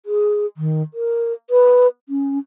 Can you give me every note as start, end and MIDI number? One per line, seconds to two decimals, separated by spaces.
0.06 0.46 68
0.57 0.82 51
0.94 1.33 70
1.50 1.87 71
2.09 2.38 61